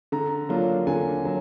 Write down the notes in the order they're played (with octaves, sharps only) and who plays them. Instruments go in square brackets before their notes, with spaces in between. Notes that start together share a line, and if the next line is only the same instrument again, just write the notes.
[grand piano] D3 A#5
F#3 A#3 D4 F4
D3 G#5
F#3